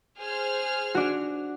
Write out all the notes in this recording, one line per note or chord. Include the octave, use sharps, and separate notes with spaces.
G#4 C5 F6
D4 F#4